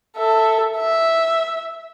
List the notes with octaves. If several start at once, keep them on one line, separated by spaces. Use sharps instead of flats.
A4 E5
E5